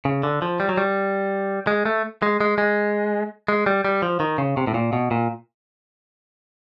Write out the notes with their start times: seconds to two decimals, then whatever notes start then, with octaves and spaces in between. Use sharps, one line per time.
0.05 C#3
0.23 D3
0.42 F3
0.60 G3
0.69 F#3
0.78 G3
1.67 G#3
1.86 A3
2.22 G#3
2.41 G#3
2.58 G#3
3.48 G#3
3.66 G3
3.85 G3
4.02 F3
4.20 D#3
4.38 C#3
4.57 C3
4.67 A2
4.74 A#2
4.93 B2
5.11 A#2